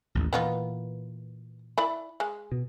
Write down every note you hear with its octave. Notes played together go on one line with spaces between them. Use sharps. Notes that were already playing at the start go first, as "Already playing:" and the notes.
A1 D#2
A#2 E3 B3 D#4 F4
E4 D5 B5
G#3
B2